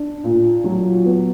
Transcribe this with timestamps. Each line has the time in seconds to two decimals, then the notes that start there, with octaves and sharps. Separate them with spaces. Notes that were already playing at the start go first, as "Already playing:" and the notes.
Already playing: D4
0.24 A#2
0.64 F#3
1.05 B3